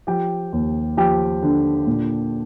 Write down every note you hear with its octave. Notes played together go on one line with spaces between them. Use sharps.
F3 G4 G5
D#2
F3 G4 G5
D3
A#2